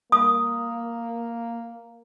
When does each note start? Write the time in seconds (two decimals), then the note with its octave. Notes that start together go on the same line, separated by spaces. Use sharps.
0.12 A#3 D#6